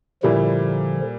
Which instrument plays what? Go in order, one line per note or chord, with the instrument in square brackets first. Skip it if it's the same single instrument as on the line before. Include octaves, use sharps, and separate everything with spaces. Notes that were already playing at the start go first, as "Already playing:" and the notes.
[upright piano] A#2 G3 A#3 E4 [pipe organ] D3 F3